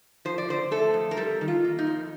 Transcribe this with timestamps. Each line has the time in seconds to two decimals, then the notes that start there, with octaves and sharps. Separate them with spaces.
0.25 F3 C5
0.38 D5
0.48 D3 C5
0.71 A3 A4
0.94 F2
1.11 A#4
1.17 G3 A4
1.41 D#3
1.48 F4
1.64 A#3
1.79 D#4
1.87 F2